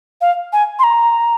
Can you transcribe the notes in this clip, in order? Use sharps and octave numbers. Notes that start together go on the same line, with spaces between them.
F5
G#5
C6
A#5